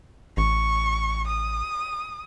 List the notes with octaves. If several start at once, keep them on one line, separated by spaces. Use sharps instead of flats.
A1 C#6
D#6